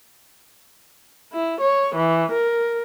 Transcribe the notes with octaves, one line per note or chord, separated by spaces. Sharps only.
E4
C#5
E3
A#4